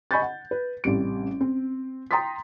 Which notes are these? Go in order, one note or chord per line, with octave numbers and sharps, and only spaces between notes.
D#5 G#5 B5 C#6 G6 A6
F#5
B4
A1 C3 G3 D7
C4
G5 A#5 C6 D#6 A6 B6